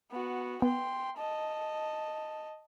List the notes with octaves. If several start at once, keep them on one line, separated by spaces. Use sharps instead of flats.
B3 F#4
B3 G5 C6
D#5 A5